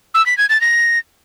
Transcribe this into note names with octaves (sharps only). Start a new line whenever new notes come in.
E6
B6
G#6
A6
A#6